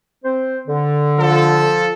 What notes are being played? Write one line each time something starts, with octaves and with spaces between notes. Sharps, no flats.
C4 C5
D3
F3 F4 A4